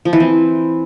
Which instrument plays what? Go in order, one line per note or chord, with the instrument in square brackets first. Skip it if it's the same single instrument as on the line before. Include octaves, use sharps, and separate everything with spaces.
[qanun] F3
E3
C4